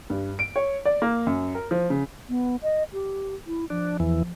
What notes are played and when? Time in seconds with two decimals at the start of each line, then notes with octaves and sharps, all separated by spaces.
0.10 G2
0.39 D7
0.56 C#5
0.85 D5
1.02 A#3
1.27 F#2
1.55 A#4
1.71 F3
1.90 C#3
2.29 B3
2.63 D#5
2.93 G4
3.47 E4
3.70 F3 D4
4.00 E2 E3